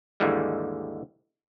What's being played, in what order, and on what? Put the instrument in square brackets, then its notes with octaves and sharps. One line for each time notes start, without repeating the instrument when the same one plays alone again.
[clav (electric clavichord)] D#2 G#2 D3 E3 G3 G#3